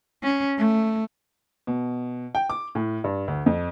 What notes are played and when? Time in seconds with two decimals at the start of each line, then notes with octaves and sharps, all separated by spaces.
0.23 C#4
0.57 A3
1.67 B2
2.35 G5
2.50 D6
2.75 A2
3.04 G2
3.28 D2
3.46 F2